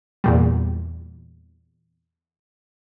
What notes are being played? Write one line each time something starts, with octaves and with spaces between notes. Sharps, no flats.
E2 A#2 G3